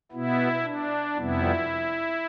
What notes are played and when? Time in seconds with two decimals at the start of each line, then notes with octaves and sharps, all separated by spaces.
0.12 B2 B3 E4
0.63 D4
1.16 F2 C3 G3 B3 E4